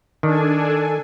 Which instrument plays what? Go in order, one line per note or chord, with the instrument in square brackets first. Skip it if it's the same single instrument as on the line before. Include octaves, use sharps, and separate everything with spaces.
[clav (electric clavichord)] D#3 [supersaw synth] D4 [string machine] A4 G#5